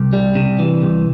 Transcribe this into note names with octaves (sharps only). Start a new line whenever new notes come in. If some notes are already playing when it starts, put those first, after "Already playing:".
Already playing: C2 G4
G3
C3
E3
C2